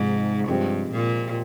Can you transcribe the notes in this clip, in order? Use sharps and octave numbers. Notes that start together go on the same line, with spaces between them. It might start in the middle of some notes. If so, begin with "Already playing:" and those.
Already playing: G#2 C3 F3 G#3 D#4 G#4
G2 F3 G#3 C4 G4
A#2